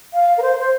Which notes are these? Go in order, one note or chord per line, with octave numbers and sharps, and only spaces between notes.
F5
A#4
C5
C5